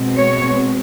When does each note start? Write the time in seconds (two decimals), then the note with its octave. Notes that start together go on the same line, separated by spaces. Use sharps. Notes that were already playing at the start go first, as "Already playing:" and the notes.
Already playing: B2 G#3 C4
0.15 C#5